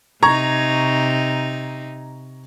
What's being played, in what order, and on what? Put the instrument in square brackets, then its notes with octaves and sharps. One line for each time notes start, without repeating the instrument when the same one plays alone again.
[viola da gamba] C3 D#4 [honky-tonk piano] A#5 C#6 G#6